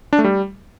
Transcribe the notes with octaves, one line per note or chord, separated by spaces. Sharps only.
D4
A3
G3